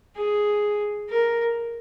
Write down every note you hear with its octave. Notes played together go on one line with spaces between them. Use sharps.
G#4
A#4